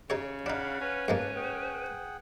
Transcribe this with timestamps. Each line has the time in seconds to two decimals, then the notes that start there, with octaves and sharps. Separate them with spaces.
0.10 C#3 D#4 G#4 C#5
0.46 D4 D#4 F5 F#5 B5
0.81 C#4 B4
1.08 G#2 G#3 A#3 A5
1.36 G#4 F#5 G5